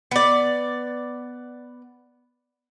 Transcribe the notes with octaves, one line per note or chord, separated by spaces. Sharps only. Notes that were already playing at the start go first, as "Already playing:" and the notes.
B3 D5